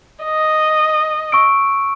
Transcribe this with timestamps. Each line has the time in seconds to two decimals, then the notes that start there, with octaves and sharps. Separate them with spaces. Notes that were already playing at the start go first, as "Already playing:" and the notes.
0.24 D#5
1.32 C#6 E6 D7